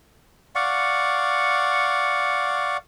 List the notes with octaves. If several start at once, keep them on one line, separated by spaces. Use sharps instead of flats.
D5 F5 F#5 C#6